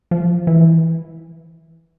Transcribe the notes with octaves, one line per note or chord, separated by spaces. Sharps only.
F3
E3